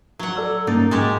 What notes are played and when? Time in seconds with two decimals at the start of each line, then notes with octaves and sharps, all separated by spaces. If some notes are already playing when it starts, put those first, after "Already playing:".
0.19 F#3 F#5
0.37 A4 D5 E6
0.67 G2 A#3 C#4 D#4 A6
0.91 G#2 G#3 F#4 G4